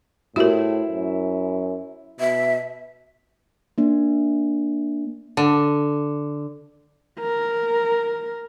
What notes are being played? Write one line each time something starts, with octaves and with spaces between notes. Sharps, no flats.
A2 E4 F#4 G4 A#4 C5
F#2
B2 E5
A#3 D4
D3
A#4